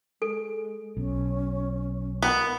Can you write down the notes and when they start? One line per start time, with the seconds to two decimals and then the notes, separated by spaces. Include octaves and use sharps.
0.22 G#3 A4
0.97 B1 C#4
2.23 B3 A#4